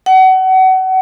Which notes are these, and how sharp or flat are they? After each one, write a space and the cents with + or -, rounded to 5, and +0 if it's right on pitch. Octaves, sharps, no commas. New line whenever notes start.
F#5 +30